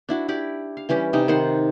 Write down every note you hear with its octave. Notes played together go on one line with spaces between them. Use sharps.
D4 E4 F#4
E4 G4 D5
F5
E3 G3 C#4 G4
C3 G3 D#4
D#3 C5 F#5 C6